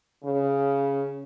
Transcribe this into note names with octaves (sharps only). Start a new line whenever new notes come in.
C#3